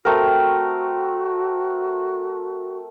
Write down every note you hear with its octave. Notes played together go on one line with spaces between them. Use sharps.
A3 C4 F#4 A#4